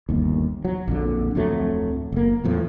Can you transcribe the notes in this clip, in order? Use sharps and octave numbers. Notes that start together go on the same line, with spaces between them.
G1 D#2
F#3
A#1 F2 D3
D1 F2 F#3 A3
F#1 A#3
D1 E2 A2 F3